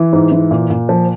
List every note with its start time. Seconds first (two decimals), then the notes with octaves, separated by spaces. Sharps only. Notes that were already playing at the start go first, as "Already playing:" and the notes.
Already playing: E3
0.13 G#2
0.32 E3
0.51 A#2
0.70 A#2
0.89 F3